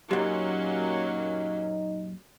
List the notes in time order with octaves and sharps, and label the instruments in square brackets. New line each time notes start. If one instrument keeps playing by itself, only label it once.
[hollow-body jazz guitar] F#2 A#2 [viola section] F#3 A#3 C#4 [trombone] D#4 [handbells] G4